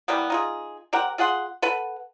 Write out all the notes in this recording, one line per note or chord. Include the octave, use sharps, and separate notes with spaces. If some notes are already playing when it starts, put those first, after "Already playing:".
E3 G3 A#3 B3
D#4 F4 G#4
C3 G4 A#4 F#5
F4 G#4 F#5 C6
A4 B4 F#5